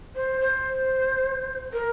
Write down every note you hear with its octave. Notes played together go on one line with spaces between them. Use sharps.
C5
C5
A#4